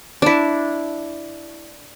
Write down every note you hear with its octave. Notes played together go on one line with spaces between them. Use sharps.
D4 E4